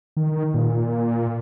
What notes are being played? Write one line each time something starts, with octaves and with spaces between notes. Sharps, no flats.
D#3
A#2